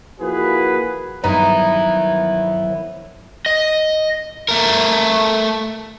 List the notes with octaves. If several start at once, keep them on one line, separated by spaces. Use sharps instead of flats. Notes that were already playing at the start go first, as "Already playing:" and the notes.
F3 A#3 E4 F#4 G#4 B4
G2 D#3 F3 F#3 B3 D#4 E4 B4
D#5
A3 A#4